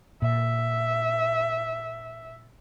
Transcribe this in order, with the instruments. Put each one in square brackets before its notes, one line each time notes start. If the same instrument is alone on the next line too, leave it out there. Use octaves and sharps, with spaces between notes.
[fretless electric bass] A#2 [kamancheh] E5